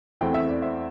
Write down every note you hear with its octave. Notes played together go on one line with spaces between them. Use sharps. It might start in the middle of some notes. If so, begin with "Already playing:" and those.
E2 E3 A3 C4 G5
E5
D5
C5 E5